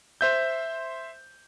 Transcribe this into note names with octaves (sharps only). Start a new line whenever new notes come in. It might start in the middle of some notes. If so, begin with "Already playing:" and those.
C5 E5 G6